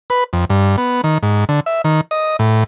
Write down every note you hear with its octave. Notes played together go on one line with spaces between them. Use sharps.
B4
F2
G2
B3
D#3
G#2
D3
E5
D#3
D#5
A2